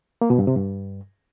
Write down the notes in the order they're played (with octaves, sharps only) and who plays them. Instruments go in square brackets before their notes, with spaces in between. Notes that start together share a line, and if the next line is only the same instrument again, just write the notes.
[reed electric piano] A#3
B2
G2
C3
G2